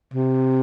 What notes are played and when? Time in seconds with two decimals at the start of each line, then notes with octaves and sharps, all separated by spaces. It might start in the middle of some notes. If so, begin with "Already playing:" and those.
0.14 C3